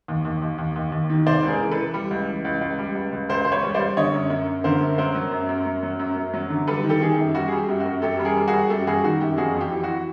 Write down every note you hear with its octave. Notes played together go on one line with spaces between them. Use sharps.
D#2
D#2
D#2
D#2
D#2
D#2
D#3
C3 C5 D5
C#2
G#4 A#4
E3
E3 A4 B4
G3
C#2
E3
C#2
C#2
G3
C#2
C#2
C#2 A#4 C5
C#2 C5
B4 C#5
G3
C5 D5
G3
D3 C#5 D#5
F#2
F#2
F#2
D3 A#4 C5
F#2
F#3 A#4 C5
F#3
F#2
F#2
F#2
F#3
F#2
F#2
F#3
D3
G3 A4 B4
D#3
G4 A4
D#3 G#4
G4
F#2
G3 F#4
G3 G#4
G4
F#2
F#4
F#2
F#2 G4 A4
G3
G#4 A#4
G3
F#4 G#4
G3
F#2 G4 A4
G3 F#4 G#4
D#3 F#4
F#2 G4
F2 F#4 G#4
F2
G4
E3
E3 F#4